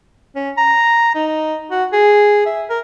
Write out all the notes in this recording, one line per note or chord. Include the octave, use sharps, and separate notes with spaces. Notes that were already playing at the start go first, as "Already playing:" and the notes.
C#4
A#5
D#4
F#4
G#4
E5
A#4